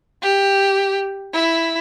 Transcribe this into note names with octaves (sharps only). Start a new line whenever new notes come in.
G4
E4